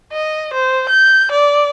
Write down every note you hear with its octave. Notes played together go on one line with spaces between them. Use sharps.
D#5
C5
G6
D5